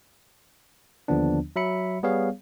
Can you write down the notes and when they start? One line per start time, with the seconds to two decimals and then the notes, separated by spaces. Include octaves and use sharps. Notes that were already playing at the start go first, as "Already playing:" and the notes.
1.08 D#2 D3 F3 B3 D4
1.56 F#3 E5 B5 C#7
2.03 G3 B3 G#4 C#5 F5